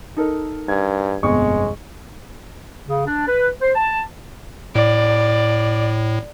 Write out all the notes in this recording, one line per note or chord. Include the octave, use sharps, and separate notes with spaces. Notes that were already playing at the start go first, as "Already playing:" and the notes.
D#4 A4 A#4
G2 G#6
G1 F2 B2 G#3 C#6
C#3
D4
B4
C5
A5
A2 D5